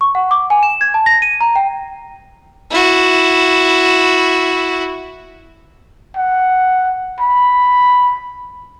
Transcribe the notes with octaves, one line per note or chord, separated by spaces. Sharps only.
C#6
F#5
D6
G#5
E7
G#6
A5
A#6
D#7
A#5
G5
E4 F#4
F#5
B5